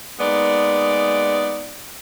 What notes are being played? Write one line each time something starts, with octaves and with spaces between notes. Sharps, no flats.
G#3 A#3 B3 D#4 D5